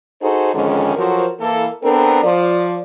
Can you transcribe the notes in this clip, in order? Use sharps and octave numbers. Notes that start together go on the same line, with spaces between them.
D#4 F#4 G#4 A4 C5
F2 G#2 D3 D#3 G#3 C#4
F3 F#3 F#4 A4 A#4 C5
E3 A#3 A4
B3 C4 D4 A4 A#4
F3 D5